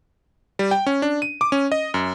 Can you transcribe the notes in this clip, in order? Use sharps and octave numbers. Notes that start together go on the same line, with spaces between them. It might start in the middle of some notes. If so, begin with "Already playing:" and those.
G3
G5
C#4
D4
D#7
D6
C#4
D#5
F#2